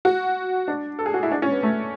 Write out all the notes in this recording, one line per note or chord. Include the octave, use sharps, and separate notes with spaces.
F#4
D4
A4
G#4
F#4
E4
D4
C#4
B3
A3